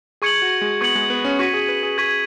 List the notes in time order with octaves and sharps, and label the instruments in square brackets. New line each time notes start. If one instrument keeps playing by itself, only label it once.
[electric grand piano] G#4 [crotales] C#6 G#6 C#7 F#7
[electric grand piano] F#4
G#3
[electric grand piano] B3 [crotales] C#6 G#6 C#7 F#7
[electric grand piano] G#3
B3
C#4
[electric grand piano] F#4 [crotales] C#6 G#6 B6 D#7
[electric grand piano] G#4
B4
G#4
[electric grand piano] G#4 [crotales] C#6 G#6 B6 D#7